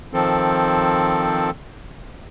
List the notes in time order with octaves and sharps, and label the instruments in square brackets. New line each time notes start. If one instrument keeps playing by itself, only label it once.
[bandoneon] D#3 F3 C4 A4